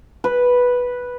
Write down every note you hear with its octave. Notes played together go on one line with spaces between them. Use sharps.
B4